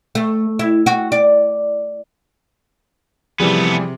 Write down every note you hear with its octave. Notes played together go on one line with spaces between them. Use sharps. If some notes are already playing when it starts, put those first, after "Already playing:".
A3
E4
F#4
D5
C3 E3 F3 G3 A3 B3 G#4